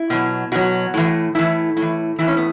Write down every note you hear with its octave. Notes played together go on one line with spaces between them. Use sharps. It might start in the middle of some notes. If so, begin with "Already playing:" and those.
Already playing: E4
B2 F#3
B2 F#3 F#4
A2 E3
A2 E3 E4
A2
E3
A2 E3 E4
C#4
B3